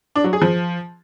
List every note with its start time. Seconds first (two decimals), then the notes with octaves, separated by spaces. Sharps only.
0.16 D4
0.24 F#3
0.33 G#4
0.42 F3